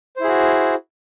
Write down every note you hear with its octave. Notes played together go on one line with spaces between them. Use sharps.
E4 F#4 G#4 C5